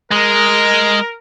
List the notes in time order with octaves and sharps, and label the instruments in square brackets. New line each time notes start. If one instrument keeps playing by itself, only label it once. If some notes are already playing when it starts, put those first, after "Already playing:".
[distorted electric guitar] G#3 [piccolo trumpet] A#4